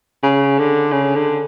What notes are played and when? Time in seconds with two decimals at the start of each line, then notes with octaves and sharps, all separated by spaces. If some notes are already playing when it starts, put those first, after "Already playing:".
0.23 C#3
0.59 D3
0.92 C#3
1.15 D3